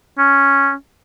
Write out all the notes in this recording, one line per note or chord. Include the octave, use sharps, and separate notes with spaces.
C#4